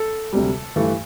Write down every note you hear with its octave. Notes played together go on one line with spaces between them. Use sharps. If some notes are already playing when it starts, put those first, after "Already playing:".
Already playing: A4
D2 C3 G3
G2 E3 A3